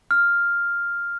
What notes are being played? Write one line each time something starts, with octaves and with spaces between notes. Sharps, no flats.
F6